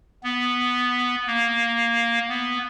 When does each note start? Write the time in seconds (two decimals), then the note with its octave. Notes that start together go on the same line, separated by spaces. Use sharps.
0.24 B3
1.27 A#3
2.29 B3